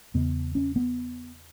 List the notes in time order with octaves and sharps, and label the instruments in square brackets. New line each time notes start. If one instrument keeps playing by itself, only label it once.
[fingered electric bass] E2 C#3 B3
C#4
B3